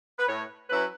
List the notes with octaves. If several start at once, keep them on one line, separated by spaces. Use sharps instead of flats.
B4
A2 C#5
F#3 C#4 E4 B4